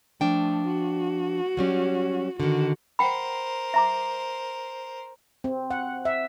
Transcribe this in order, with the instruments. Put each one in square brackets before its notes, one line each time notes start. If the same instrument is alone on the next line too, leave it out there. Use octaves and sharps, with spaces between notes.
[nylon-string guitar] F3 D4 G5 [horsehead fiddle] A3
[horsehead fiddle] F#4
[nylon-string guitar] F#3 G3 C#4
[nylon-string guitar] D3 D#3 [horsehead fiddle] F#4
[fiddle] A#4 C5 [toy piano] F#5 G5 B5
[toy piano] E5 A#5 D6
[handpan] C4
F#5
E5